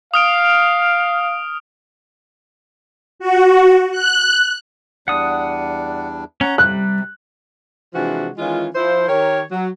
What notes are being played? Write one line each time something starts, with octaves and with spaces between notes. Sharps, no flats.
F5 D#6 F6 D7
F#4
F#6
E2 G3 D4 F#5 D#6
C#4 F#5 A#5
C3 G3 F#6
C3 E3 F3 G#3 D4 F#4
D#3 E3 G#3 C#4 F4
F3 E4 C5
D#3 G4 A#4 C#5
F#3